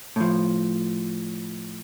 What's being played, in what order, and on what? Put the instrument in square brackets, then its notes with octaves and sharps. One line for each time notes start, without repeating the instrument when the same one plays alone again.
[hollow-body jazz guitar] A2 F3